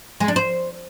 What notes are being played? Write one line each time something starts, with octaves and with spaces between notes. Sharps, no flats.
G#3
D4
C5